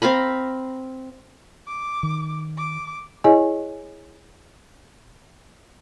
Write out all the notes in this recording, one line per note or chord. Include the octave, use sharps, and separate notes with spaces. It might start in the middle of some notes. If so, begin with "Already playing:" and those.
C4 F5 A#5 B5
D6
D#3
D6
E4 G#4 C#5 D#5 G#5